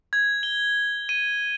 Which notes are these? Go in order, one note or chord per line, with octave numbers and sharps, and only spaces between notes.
G#6
G7
D#7